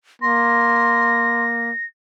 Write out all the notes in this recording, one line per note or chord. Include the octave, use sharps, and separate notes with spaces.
A#3 C6 A#6